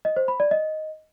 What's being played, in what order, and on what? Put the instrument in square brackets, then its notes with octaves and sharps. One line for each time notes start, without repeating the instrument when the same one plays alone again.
[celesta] D#5
C5
B5
D5
D#5